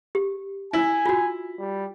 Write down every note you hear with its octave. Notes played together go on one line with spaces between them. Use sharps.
G4
E4 G#5
F4 F#4
G3